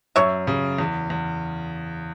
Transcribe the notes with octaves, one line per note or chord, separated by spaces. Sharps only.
F#2 C#5 E5
C#3
E2
E2